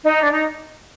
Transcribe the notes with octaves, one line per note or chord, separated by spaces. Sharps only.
D#4
D4
D#4